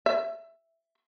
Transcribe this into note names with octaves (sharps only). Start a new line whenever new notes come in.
E5